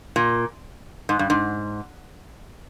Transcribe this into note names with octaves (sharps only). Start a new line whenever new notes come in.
A#2
G#2
G2
G#2